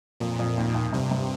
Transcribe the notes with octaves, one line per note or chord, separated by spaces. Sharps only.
F2 A#2
F2
D#2
D#2
G2 C3
G2